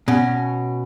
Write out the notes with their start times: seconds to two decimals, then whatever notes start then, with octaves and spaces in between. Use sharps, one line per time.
0.08 B2 C#4